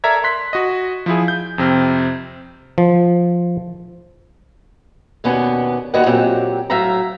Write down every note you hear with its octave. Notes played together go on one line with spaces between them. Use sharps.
A4 A#4 D5 E5 A#5 G#6
C6 F#6 B6
F#4 D#5
F3 E4 G#4
G6
F2 C3 C4 F6
F3
D#2 B2 B3 C#4 D4
D#2 G3 F#4 C#5 D#5 F#5
A#2 F#3 C4 G4
A2 F#3 E5 F5 A#5